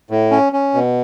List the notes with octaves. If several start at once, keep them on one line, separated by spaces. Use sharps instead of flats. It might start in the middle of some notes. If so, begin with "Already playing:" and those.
A2
C#4
C#4
B2